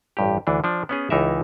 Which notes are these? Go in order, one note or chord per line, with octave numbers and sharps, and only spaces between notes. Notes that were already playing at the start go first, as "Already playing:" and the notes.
A1 G2 G4
D2 E3 D4
F3 D4
B3 C#4 G#4
C#2 E3 D#4 A#4 E5